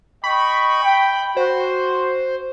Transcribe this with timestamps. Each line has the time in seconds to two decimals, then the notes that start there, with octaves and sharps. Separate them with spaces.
0.24 D#5 G5 B5 C#6
0.83 G5
1.37 F#4 C5